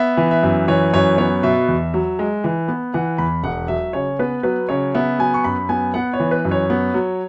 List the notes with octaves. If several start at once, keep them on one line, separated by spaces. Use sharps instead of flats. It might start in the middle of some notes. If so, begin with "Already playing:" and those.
Already playing: B3 E5
E3
E5
F#2
E3 C#5
F#2 C#5
B3 C#5
B2 E5
E2
F#3
G#3
E3
B3
E3 F#5
E2 B5
E1 F#5
F#3 E5
C#3 C#5
B3 B4
F#3 B4
C#3 C#5
B3 E5
F#3 G#5
C#6
F#2 B5
B3 G#5
B3 F#5
C#5
E3
B4
F#2
C#5
B3
F#3